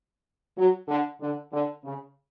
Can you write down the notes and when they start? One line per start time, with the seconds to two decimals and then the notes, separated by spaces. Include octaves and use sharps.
0.57 F#3
0.88 D3
1.21 D3
1.52 D3
1.84 C#3